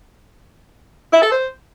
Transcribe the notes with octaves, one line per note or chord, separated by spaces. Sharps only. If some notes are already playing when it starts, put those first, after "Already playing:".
E4
A4
C5